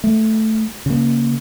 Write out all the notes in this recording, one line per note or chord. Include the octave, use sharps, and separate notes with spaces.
A3
C#3 A#3